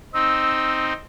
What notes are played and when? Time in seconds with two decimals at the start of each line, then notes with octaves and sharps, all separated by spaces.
0.14 C4 D#4 E6